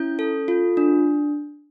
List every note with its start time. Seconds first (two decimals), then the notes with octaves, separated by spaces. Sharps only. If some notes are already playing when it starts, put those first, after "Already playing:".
Already playing: C#4 E4 G6
0.19 A4
0.48 F4
0.77 D4